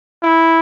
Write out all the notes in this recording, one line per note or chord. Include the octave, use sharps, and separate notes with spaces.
E4